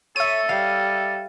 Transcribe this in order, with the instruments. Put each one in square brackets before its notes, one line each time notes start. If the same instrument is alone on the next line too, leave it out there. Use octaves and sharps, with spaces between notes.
[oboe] A4 [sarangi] C#5 [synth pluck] E5 D#7
[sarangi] G3 [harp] F5